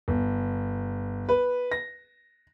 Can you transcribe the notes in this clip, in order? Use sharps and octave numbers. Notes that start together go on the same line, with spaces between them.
G1
B4
A#6